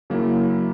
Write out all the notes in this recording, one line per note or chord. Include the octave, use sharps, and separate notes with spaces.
C#3 F#3 A#3 E4